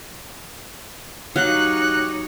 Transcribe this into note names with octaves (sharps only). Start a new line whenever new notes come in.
F#3 D#4 G4 C#5 F5 F#6